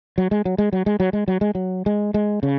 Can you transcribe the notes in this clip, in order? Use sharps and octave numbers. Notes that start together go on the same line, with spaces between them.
F#3
G#3
F#3
G#3
F#3
G#3
F#3
G#3
F#3
G#3
F#3
G#3
G#3
C#3